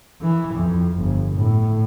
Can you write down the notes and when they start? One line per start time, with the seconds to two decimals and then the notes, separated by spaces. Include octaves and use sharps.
0.21 E3
0.54 F2
0.96 G1
1.35 A2